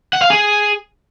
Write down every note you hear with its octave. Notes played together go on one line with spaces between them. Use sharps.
F#5
F5
G#4